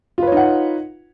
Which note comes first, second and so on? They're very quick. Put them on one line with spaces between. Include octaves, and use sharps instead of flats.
F4 B4 C#5 D#4 F#5